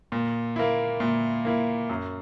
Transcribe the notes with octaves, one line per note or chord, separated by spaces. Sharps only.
A#2
A#3 E4
A#2
A#3 E4
F#2